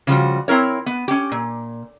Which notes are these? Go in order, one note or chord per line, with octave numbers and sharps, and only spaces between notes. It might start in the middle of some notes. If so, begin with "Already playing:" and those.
C#3 F3 G3 F#4
C4 E4 A#4 C#5
B3
C#4 G4
A#2